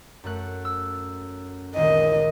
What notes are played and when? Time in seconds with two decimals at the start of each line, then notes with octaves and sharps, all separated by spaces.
0.24 F#2 A3 F#6
0.65 E6
1.76 C#2 A#2 D#3 D#5